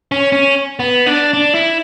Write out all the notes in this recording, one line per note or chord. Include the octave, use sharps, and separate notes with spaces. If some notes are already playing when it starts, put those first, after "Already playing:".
C#4
C#4
B3
D4
D4
E4